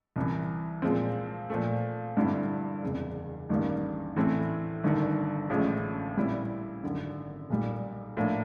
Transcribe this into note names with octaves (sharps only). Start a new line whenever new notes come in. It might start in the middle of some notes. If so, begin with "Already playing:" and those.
C2 C3 E3
A#2 F3 G#3 C4
A#2 F3 A3
G2 D3 G3 C4 E4
F#1 E2 C3
A1 G2 D#3 G3 A#3
A2 E3 A3 C4 E4
G1 G2 D#3
A1 A2 F3 G#3 C#4
A#2 G3 C4 E4
G#1 F#2 D3
B1 A#2 G3
A2 F3 A#3 D4